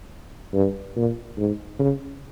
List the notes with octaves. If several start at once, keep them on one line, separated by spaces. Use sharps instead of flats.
G2
A#2
G#2
C#3